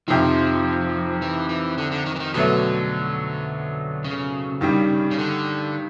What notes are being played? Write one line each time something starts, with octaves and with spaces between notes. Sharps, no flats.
F2 C3 D#3 F3
E3
E3
D3
D3
D#3
E3
D#3
B2 D3 F#3 A3
C#3
G2 D#3 G3
C#3
D3